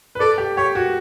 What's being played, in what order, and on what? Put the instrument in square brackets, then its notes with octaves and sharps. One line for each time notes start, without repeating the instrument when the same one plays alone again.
[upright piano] B4
[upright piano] A4 [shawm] D5
[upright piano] G4
[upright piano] G4 [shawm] C#5
[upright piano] F#4